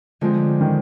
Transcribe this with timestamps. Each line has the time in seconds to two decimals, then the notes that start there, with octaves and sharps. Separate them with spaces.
0.21 D3 F3 G#3 C4
0.61 D#3